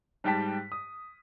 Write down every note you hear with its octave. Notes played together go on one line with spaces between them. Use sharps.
G#2 G3 G5 A5 B6
D#6